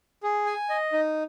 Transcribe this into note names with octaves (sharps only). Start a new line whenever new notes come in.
G#4
G#5
D#5
D#4